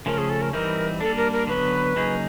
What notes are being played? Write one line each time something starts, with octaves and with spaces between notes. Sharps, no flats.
C#3 F3 A3 C#4 A#4
G#4
A4
A#4
E3 G3 C4 D#4 A#4
G3 A#3 D4 A4
A#4
A#4
D3 F#3 B3 B4
C#3 F#3 A#3 D#4 G#4